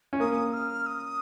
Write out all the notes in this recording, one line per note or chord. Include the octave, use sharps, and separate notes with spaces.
C#4
A#3 D#6
F6
D#6